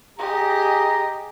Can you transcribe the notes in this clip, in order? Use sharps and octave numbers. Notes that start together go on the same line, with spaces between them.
G4 G#4 D#5 A#5